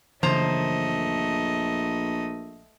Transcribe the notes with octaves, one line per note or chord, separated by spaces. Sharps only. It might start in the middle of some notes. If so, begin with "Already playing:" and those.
A#1 F#2 C#3 E3 A3 C5 D#5 A#5